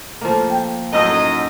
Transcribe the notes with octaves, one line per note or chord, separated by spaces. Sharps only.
F3 A3 A#3
G5
F#2 A2 D#4 D#5 A5 E6